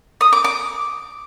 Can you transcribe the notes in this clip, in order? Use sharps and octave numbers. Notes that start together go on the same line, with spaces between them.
D#6
D6
D6